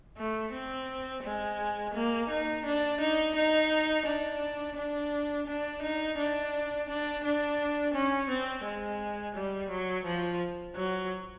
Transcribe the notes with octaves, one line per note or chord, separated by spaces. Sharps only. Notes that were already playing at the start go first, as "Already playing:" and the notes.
A3
C4
G#3
A#3
D#4
D4
D#4
D#4
D4
D4
D4
D#4
D4
D4
D4
C#4
C4
G#3
G3
F#3
F3
F#3